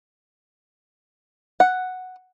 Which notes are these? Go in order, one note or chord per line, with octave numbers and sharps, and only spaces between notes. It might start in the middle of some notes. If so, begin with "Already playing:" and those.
F#5